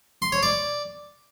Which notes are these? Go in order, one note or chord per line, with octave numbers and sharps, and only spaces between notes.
C6
C#5
D5